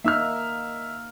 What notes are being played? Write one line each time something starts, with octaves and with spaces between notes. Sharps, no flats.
A#3 D#4 E5 E6 F6